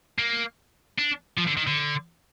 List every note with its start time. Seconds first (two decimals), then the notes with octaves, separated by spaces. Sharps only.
0.18 A#3
0.98 D4
1.38 F3
1.47 D3
1.57 D#3
1.67 D3